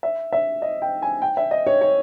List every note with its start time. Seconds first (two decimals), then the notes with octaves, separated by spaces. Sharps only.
0.03 E5
0.32 E5
0.62 D#5
0.82 G5
1.02 G#5
1.22 G5
1.37 E5
1.51 D#5
1.67 C#5
1.81 C#5